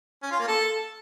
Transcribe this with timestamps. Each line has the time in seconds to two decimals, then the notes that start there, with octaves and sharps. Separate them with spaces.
0.23 C#4
0.31 F4
0.39 A#3
0.48 A4